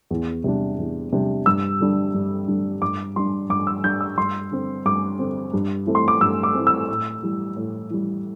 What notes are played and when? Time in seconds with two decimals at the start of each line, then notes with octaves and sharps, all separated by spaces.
0.11 E2
0.44 C3 G3 D4
0.78 E2
1.12 C3 G3 D4
1.46 G2 E6
1.80 D3 G3 D4
2.14 G2
2.48 D3 G3 D4
2.82 G2 D6
3.16 G3 D4 C6
3.49 G2 D6
3.67 E6
3.84 G3 D4 G6
4.01 E6
4.17 G2 C6
4.52 D3 C4
4.85 G2 D6
5.19 D3 C4
5.53 G2
5.86 E3 A3 C4
5.95 C6
6.08 D6
6.21 G2 E6
6.43 D6
6.55 E3 A3 C4
6.67 E6
6.88 A2
7.23 E3 G3
7.56 A2
7.90 E3 G3